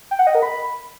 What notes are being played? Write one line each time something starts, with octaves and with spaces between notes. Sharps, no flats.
G5
F#5
D#5
A#4
B5